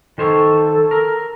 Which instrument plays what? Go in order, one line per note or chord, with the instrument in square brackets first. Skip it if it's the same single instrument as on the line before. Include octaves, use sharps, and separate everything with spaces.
[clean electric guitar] D#3 C5 C#5 [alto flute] A4
[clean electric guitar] A#4